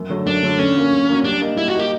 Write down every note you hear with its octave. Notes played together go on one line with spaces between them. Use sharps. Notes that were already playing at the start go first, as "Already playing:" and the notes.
Already playing: F#2
D3 F#3 A3
F#2 D4
D3 F#3 A3
D3 C#4
F#3 A#3
D3
F#3 A#3
G3 D4
A#3 D#4
G3 E4
F#4
A#3 D#4 G4